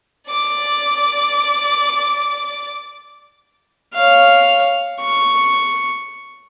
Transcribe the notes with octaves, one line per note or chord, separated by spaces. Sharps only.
D5 D6
C#5 F5
C#6